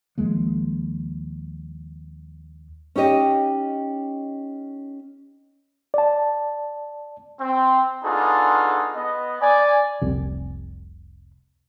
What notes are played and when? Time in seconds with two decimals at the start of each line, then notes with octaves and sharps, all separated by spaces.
0.18 D#2 F3 G#3 A#3
2.96 C#4 D#4 G4 D#5
5.94 D5 A5
7.40 C4
8.04 B3 D4 D#4 F4 G#4 A4
8.96 B3 D#5
9.42 D5 G#5
10.01 F1 C2 C3